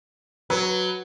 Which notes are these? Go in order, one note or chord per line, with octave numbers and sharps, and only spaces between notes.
F#3 B4